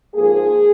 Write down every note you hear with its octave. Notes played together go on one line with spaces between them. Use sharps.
G#2 F3 A#3 G#4